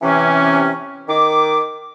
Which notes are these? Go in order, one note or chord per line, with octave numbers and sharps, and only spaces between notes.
C3 E3 C#4
D#3 D6